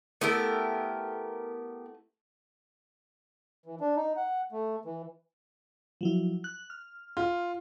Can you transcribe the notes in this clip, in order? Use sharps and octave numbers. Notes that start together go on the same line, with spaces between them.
A3 B3 E4 G4 A4 A#4
E3
D4
D#4
F#5
A3
E3
F3 F#3 E4
F#6
F6
F4